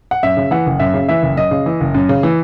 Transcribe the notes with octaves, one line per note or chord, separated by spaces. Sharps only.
F#5
F#2 E5
C#3
E3 F#5
F#1
F#2 E5
C#3
E3 E5
F#1
F#2 D#5
C#3
E3
F#1
F#2
C#3
E3